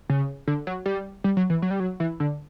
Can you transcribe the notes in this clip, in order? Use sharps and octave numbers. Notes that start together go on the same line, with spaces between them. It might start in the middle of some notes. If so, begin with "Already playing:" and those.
C#3
D3
F#3
G3
G3
F#3
E3
F#3
G3
F#3
E3
D3